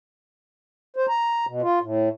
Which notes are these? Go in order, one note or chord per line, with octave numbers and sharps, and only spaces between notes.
C5
A#5
B2
F4
A2